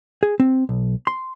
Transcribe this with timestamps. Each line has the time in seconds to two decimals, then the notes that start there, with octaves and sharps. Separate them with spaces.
0.23 G#4
0.40 C4
0.69 B1
1.07 C6